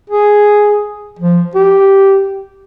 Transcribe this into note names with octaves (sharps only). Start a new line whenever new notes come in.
G#4
F3
G4